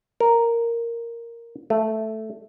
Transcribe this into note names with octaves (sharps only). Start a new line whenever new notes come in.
A#4
A3